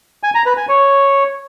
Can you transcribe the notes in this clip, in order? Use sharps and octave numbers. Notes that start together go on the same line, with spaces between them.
G#5
A#5
B4
G#5
C#5